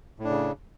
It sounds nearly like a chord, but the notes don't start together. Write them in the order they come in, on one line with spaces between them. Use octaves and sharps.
A2 D4 C#3